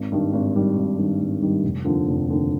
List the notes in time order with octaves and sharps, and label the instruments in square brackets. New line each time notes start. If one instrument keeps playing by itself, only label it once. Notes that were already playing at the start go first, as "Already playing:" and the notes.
Already playing: [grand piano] G#1
G2 D#3 G3
G#1
G2 D#3 G3
G#1
G2 D#3 G3
G#1
G2 D#3 G3
F1
D#2 D3 F3
F1
D#2 D3 F3